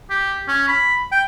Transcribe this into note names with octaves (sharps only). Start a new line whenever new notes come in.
G4
C#4
B5
G5